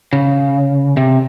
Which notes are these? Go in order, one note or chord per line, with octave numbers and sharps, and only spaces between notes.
C#3
C3